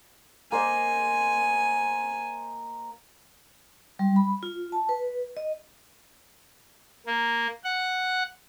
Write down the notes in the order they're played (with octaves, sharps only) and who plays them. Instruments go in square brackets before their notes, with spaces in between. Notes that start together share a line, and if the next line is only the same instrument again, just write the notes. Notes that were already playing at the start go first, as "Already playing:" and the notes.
[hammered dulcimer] A#3 C5 D#5 [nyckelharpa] G#5
[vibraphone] G3
B5
F4
A5
B4
D#5
[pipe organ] A#3
F#5